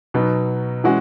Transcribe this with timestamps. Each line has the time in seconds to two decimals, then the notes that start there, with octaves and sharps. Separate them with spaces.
0.14 B2 F#3 B3 D#4
0.84 E3 G#3 C#4 F#4